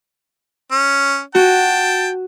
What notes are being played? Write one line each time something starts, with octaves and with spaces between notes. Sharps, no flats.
C#4
F#4 G5 A5